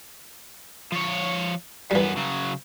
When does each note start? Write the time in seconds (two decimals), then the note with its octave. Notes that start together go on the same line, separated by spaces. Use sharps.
0.92 F3 C#5
1.91 F#2 E3 G3 B3
2.16 C#3 F#3